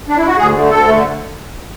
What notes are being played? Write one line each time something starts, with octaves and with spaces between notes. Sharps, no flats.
D4
E4
F#4
D2 G#4
D3
A3
D2 A4
D3 A3